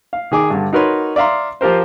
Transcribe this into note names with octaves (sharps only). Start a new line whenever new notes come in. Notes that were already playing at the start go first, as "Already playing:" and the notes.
F5
D#3 G#4 D6
G2 D3
D#4 F#4 A#4 B4 C#5 C6
D5 E5 F5 A#5 C6
F3 F4 G4 A#4 C5